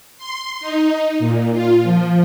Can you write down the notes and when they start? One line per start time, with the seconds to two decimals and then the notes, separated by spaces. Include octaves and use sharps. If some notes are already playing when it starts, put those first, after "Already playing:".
0.18 C6
0.60 D#4
1.19 A#2
1.52 F4
1.83 F3